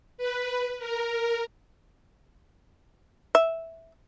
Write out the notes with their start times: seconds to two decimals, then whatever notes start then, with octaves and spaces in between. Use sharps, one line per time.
0.18 B4
0.79 A#4
3.35 E5